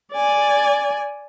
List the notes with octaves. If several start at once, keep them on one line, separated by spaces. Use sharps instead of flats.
D5 G#5